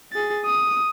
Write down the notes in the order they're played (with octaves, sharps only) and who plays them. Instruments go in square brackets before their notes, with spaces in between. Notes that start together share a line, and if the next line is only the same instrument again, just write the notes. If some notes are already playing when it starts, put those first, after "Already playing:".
[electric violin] G#4 A6
D#6